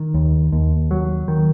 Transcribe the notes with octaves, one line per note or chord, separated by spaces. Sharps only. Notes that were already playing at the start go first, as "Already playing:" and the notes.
Already playing: D#3
D#2
D#2
F#3
D#3